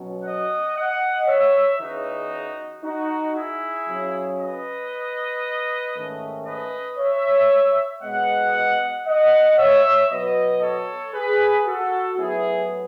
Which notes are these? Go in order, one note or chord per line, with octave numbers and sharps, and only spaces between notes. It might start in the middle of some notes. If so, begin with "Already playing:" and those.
Already playing: B2 F#3 C#4
D#5 F#5
D#5 F#5
C#5 E5
E2 C#3 E3 D#4 F#4
D#4 F#4
E4 G#4
C#3 F#3 C#4
B4 D#5
G#2 D#3 A3 C#4
B4 D#5
C#5 E5
B2 G#3 B3 D#5 F#5
D#5 F#5
C#5 E5
B2 F#3 B3 B4 D#5
A4 C#5
G#4 B4
F#4 A4
A2 F#3 B3 E4 G#4